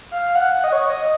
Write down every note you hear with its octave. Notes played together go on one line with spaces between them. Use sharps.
F5
F#5
F#5
D#5
C#5
D#5